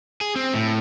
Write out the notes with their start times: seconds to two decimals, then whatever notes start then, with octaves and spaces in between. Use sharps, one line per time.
0.21 G#4
0.36 C4
0.54 A2